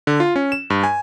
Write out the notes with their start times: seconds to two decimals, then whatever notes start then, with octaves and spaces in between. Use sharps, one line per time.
0.07 D3
0.20 F4
0.36 C#4
0.52 E7
0.70 G2
0.83 G#5